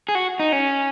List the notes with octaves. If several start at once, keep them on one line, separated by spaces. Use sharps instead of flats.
G#4
F#4
D#4
C#4